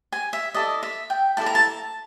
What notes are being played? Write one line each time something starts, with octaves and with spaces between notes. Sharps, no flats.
G#5
E5
E4 A4 D5 D#5
E5
G5
E4 A4 D5 A5
A#5
A5